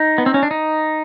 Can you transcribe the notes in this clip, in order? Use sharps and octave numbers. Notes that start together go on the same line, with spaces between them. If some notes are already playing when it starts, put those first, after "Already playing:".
Already playing: D#4
B3
C4
C#4
D4
D#4